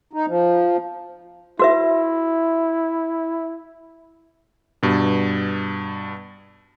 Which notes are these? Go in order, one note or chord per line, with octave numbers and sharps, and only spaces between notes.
D#4
F3
E4 F#4 B4 E5
G2 B2